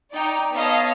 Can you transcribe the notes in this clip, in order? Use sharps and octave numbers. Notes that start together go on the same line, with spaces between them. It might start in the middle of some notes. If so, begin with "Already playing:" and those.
D#4 D5 G5
B3 A4 C#5 D#5 F5 A5